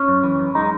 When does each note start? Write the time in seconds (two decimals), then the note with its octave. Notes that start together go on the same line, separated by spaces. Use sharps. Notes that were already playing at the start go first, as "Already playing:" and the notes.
Already playing: C#4
0.08 F#2
0.23 E3
0.39 F#2
0.55 G#3 D#4